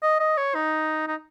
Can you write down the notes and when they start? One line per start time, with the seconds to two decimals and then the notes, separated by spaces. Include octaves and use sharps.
0.02 D#5
0.20 D#5
0.37 C#5
0.55 D#4
1.07 D#4